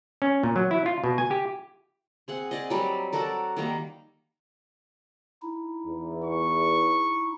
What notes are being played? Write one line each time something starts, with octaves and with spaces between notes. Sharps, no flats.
C#4
A#2
F#3
E4
F4
B2
G#5
G4
C4 G#4 F#5
G#4 D5 D#5
F#3 G3 A#4
F#4 A4 A#4 D5
D#3 G3 A#3 A#5
D#4 E4
E2
C#6